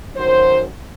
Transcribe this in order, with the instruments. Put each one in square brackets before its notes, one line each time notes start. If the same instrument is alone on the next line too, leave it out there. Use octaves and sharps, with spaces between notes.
[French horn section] F#2 D#3 F#3 C5